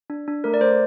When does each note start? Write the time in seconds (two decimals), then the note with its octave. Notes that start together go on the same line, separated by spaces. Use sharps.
0.10 D4
0.28 D4
0.44 A3 A#4
0.54 D5
0.61 A3 C5